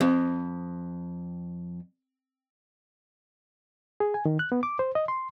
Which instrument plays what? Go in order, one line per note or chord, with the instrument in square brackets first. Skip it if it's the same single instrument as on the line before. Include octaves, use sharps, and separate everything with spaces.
[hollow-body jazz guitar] F2 [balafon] C4 C5
[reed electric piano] G#4
G#5
D#3
F#6
B3
D6
C5
D#5
C6